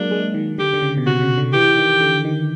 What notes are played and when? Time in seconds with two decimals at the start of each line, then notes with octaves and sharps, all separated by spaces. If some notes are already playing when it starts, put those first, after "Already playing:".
Already playing: F#3 G#3 A#3 D4
0.11 G#3
0.34 D#3
0.58 D3 G4
0.74 D3
0.82 C#3
0.98 B2
1.06 C3 F#4
1.21 C#3
1.38 D3
1.53 E3 G4
1.77 D#3
2.01 D3
2.25 D#3